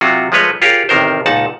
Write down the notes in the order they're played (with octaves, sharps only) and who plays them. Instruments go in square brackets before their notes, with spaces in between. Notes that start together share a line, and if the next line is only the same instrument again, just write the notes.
[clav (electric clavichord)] C3 F#3 F4 F#4
F3 G#3 A3 B4 C#5 D#5
F4 G4 G#4 A#4 C#5
A1 C3 D#3 A#4 C5
C#2 A#2 D#4 F#5 A5